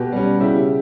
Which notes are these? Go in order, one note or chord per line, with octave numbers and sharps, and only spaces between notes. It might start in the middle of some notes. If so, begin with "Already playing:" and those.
Already playing: B2 G4 B4
G3 C#4
C#3 E4 G4